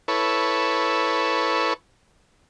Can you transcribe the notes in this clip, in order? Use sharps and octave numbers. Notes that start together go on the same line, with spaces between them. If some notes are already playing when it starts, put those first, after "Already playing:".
E4 A4 B4 C#5